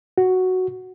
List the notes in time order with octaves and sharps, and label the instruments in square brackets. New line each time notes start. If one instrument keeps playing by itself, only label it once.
[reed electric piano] F#4